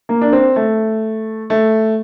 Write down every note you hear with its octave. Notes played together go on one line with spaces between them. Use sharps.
A#3
D4
C4
A3
A3